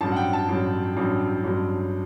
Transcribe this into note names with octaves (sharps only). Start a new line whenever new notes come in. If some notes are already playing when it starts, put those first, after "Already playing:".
A1 G2 F#3 A5
F#5
G5
A5
A1 G2 F#3
A1 G2 F#3
A1 G2 F#3